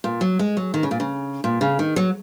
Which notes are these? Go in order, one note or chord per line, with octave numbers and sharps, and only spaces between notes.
A#2
F#3
G#3
F#3
D#3
C#3
A#2
C#3
A#2
C#3
D#3
F#3